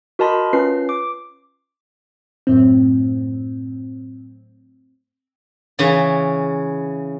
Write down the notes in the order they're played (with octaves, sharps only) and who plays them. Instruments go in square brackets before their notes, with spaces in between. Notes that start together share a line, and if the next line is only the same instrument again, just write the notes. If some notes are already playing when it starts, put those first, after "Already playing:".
[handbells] F#4 A#4 D#5 A5 B5 C6
C#4 F4 B4 C7
D6
[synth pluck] F#2 A2 C4
[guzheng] C#3 E3 C#4